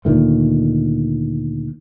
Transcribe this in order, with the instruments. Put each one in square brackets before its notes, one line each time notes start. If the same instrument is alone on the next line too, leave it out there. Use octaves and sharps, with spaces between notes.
[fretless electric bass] D2 A#2 D#3 A3